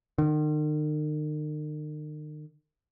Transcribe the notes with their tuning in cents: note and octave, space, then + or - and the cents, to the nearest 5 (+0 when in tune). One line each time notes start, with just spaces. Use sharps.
D#3 -45